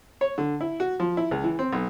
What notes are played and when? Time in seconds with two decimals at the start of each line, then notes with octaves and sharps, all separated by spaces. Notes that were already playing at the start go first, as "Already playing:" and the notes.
0.21 C#5
0.38 D3
0.61 E4
0.80 F#4
1.00 F3
1.17 E4
1.31 C#2
1.44 E3
1.59 C4
1.73 B1